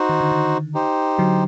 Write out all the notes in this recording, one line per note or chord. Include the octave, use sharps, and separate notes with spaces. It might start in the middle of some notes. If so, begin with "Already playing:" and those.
Already playing: D#4 F#4 C5
D#3
D3
D#3
D#4 G4 C5
D3 F#3